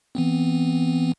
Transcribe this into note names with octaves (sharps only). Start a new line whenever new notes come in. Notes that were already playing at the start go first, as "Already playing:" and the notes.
E3 B3 C4